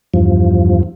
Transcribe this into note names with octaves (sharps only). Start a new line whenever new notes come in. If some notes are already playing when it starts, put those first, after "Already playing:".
E2 G2 F3